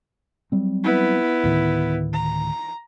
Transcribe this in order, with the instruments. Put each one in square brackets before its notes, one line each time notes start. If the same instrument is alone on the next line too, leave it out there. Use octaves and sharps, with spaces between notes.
[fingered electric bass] F#3 G3 C4
[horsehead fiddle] B3 E4
[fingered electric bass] D2 A2 D#3
[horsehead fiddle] A#5